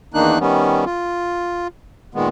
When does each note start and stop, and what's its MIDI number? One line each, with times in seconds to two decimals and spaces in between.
0.14 0.39 40
0.14 0.39 51
0.14 0.39 58
0.14 0.39 62
0.14 0.39 63
0.14 0.39 90
0.40 0.85 51
0.40 0.85 55
0.40 0.85 59
0.40 0.85 61
0.86 1.68 65
2.15 2.29 46
2.15 2.29 51
2.15 2.29 56
2.15 2.29 59